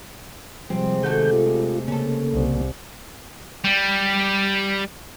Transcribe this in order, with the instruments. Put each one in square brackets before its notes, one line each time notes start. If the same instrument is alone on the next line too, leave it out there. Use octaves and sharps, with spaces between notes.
[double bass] C3 G#3 [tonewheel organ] F3 G3 [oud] C4
[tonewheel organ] D#3 G6 [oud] A3 F#4 A4
[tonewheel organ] F4
[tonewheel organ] C#3 A#3 [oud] C#4 A4
[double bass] C2
[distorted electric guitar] G3